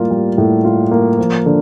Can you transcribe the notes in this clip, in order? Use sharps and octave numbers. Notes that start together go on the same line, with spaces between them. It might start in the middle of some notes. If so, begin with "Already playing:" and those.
Already playing: A2 G3 A#3 F4
G3
A2
F4
A#3
F3
D3